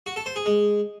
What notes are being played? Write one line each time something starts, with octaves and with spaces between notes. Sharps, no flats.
F#4
A4
C5
G#4
G#3